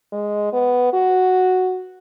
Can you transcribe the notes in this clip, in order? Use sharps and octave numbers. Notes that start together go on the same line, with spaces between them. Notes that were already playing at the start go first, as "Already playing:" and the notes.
G#3
B3
F#4